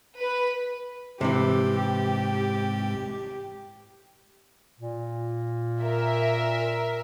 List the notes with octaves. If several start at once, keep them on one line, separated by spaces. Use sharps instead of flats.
B4
G#2 C3 E3 G#3 G4
A#2
A#4 E5